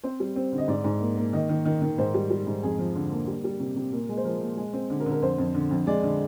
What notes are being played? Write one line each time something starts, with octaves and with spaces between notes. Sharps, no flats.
C4 C5
G3
C4
D3
D#5
G#2 D5
G#2
A#3
A#3
D#3 D#5
D#3
D#3
D#3
G#2 C5
G3
G3
G#2
F2 G#4
F3
D3
A#3
G3
G3
C3
C3
A#2 A#4
G#3
C5
F3 A#4
A#2
G#3
C4
D3
A#4
D3
A#4
F2 C5
F2
D3
F2
G#3 D5
D3